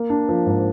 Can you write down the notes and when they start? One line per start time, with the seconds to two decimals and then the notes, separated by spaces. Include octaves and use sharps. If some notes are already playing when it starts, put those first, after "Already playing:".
Already playing: A#3
0.10 D4
0.29 F3
0.46 G#2